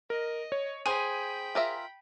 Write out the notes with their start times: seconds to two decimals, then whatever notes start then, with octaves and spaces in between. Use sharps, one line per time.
0.10 A#4 D#5
0.52 C#5
0.86 G#4 C5 G5 B5 D#7
1.55 F4 A#4 E5